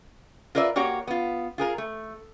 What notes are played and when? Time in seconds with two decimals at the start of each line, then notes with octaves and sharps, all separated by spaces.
0.55 F4 A#4 B4 D5 E5
0.76 A#3 F#4 G4 C#5
1.07 B3 F4
1.58 F4 G#4 A#4
1.78 A3